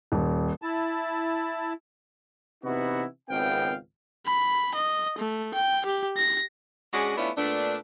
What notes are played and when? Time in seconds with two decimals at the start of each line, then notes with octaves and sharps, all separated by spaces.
0.12 D#1
0.62 E4 A5
2.64 C3 E3 B3 D#4 E4 F#4
3.29 G#1 C#2 B3 C4 F5 G5
4.26 B5
4.75 D#5
5.19 A3
5.55 G5
5.86 G4
6.17 A#6
6.94 G#3 C#4 D4 F#4 G#4
7.17 A3 B3 C#4 D4 E4 F4
7.37 A#2 A3 B3 D4